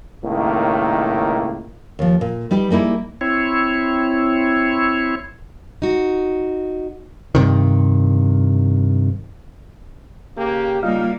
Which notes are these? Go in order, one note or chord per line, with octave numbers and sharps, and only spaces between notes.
C#2 A2 D#3 A#3
D#2 F3
A#2
G3 D#4 G4 B4
G3 A#3 D#4 E4 G#4
C4 E4 C#5
D#4 F#4
G2 C3 D#3
C#3 A#3 G4
C#3 G3 A#3 D#4 F4 F5